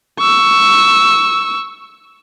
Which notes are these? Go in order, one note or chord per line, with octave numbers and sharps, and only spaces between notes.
C#6 E6